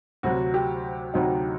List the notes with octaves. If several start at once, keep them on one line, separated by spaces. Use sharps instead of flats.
D2 C3 F#3 F#4
G4
D2 C3 F#3 D#4